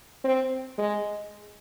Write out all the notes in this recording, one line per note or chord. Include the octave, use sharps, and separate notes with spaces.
C4
G#3